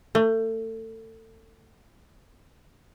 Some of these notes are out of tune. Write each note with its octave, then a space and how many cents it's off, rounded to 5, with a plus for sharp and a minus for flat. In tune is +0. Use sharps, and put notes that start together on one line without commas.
A3 +30